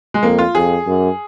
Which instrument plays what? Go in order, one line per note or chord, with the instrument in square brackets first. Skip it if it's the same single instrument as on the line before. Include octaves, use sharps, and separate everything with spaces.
[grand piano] G#3
[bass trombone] F2 [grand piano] A#3
[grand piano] F4
[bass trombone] F2 [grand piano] G#4
[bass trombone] F#2